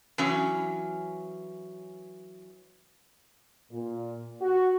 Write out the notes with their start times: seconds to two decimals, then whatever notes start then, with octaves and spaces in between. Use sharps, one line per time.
0.18 E3 F#3 C#4
3.72 A#2
4.42 F#4